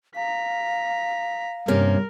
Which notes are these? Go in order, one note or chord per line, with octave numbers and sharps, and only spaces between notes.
F5 A#5 B6
G2 C3 A#3 C#4 A#4